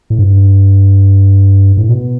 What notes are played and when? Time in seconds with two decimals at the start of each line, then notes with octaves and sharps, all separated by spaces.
0.10 A2
0.19 G2
1.77 A2
1.89 B2